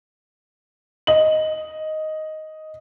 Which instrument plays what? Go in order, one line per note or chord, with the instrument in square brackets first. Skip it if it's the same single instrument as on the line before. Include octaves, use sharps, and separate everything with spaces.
[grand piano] D#5 F#7